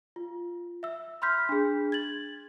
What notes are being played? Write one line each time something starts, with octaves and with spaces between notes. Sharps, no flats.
F4
E5 E6
B5 C6 F6 G6 B6
D4 G#4
G#6 A6 F#7